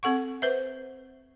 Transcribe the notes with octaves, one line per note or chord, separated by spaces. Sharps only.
C4 A4 F#5 C#6
B4 C5 E5